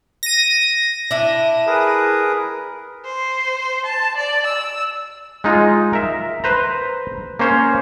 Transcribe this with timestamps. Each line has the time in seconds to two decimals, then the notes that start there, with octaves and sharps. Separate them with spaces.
0.23 A#6 D#7
1.11 D4 E4
1.67 G#4 A#4 B4
3.05 C5
3.85 A5
4.17 D5
4.46 E6
5.44 G#3 D#4 F4
5.93 A#4 E5
6.44 B4 C5 A#5
7.39 A#3 C#4 C5 C#5